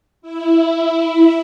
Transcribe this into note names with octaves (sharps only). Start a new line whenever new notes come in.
E4